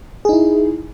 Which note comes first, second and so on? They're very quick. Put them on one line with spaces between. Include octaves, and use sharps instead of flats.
G#4 D#4 E4